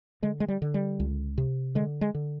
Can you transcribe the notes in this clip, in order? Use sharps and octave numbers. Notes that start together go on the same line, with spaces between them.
D3 G#3
G#3
G3
D3
G3
C#2
C3
D3 G#3
G#3
D3